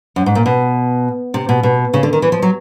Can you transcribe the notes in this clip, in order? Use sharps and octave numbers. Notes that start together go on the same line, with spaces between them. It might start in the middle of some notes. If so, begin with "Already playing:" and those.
F#2
G#2
A#2
B2
C3
B2
B2
C#3
D3
D#3
E3
F3
F#3